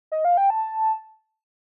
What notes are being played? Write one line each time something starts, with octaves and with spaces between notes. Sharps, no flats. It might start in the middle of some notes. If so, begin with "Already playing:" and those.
D#5
F5
G5
A5